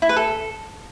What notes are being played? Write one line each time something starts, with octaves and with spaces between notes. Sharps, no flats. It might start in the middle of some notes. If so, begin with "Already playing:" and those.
E4
B4
A4